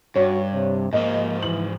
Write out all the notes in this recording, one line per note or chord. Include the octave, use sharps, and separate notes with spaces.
G2 F#4 C#5
C3
G#2 F3 A#3 D#5
E3 F#7